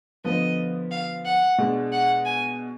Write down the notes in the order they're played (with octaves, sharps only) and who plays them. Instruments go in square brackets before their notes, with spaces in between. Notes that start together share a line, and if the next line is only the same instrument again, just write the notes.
[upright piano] D3 F3 B3 [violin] D#5
[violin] F5
F#5
[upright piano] B2 G#3 D4
[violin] F#5
G#5